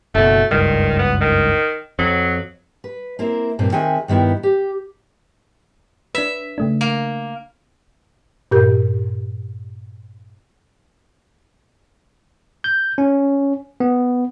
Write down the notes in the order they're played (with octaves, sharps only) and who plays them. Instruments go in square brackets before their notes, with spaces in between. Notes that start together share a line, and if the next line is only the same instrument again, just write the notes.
[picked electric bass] F#1 B2 [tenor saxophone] A3
[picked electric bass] F#1 C#2 G2 [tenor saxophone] D#3
[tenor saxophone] B3
D#3
[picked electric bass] F2 [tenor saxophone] F#3
[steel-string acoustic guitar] B4
A#3 C4 E4 A#4
G2 A#2 A#3 C4
D#3 C4 F#4 G#4 E5 G#5
G2 D#3 B3 E4 G5
G4
[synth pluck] D4 B4 [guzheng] E5
[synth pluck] C#3 A3 D4
[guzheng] A#3
[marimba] G2 A#2 G4 A#4 G6
[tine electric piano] G6
C#4
B3